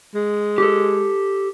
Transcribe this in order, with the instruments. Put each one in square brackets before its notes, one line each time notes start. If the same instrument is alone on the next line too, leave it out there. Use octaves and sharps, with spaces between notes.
[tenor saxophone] G#3
[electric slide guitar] G4 A4